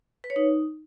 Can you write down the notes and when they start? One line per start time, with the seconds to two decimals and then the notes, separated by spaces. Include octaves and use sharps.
0.24 B4
0.30 C#5
0.36 D#4